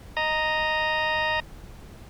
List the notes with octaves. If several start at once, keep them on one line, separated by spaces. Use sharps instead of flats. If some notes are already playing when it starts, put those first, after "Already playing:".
D#5 A#5